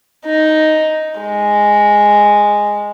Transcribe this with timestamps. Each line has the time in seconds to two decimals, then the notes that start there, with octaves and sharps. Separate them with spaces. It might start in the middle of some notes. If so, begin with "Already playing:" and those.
0.26 D#4
1.21 G#3